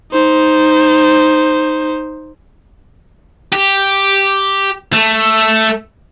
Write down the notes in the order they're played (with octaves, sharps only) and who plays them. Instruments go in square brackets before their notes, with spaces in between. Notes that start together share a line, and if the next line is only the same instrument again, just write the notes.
[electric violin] D#4 C5
[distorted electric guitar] G4
A3